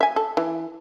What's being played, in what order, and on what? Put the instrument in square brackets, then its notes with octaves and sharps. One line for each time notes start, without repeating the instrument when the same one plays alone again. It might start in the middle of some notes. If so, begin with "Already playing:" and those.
[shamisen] E5 G#5
A4
E3